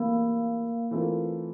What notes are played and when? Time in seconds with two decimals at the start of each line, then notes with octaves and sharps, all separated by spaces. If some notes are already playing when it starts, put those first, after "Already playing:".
Already playing: C3 E3 A3 A#3
0.91 E3 A3 C4 F4 A#4